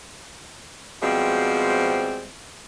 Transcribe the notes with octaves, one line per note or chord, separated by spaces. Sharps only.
B2 F3 G3 G#3 C4